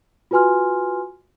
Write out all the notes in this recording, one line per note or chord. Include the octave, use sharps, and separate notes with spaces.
F4 F#4 B4 G#5 C6 F6